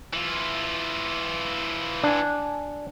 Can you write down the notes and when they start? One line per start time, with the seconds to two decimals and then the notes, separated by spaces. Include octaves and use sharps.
0.13 E3 F4
2.03 D4 G#5